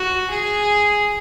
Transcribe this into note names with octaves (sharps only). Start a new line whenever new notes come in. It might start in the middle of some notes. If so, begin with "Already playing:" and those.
Already playing: F#4
G#4